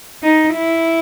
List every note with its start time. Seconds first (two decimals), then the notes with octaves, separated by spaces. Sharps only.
0.23 D#4
0.55 E4